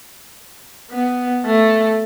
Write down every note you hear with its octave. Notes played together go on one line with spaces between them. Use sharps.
B3
A3